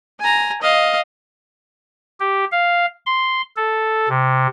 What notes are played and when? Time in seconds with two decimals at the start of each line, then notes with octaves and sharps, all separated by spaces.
0.20 G#5 A#5
0.62 D#5 F5
2.20 G4
2.52 F5
3.06 C6
3.56 A4
4.09 C3